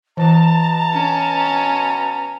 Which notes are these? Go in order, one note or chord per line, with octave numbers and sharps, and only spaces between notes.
B2 E3 A5 A#5
C#4